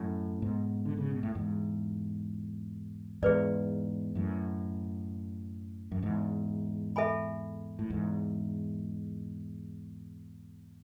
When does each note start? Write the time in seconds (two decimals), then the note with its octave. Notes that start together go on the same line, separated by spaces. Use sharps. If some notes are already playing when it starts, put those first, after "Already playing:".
Already playing: F#2 A2
0.42 G#2 B2
0.85 D3
0.98 C#3
1.10 B2
1.23 A2
1.35 E2 G#2
3.22 E2 G#2 G#4 B4 D5
4.15 F#2 A2
5.92 F#2
6.02 E2 G#2
6.96 A4 E5 G#5 B5
7.79 A2
7.90 E2 G#2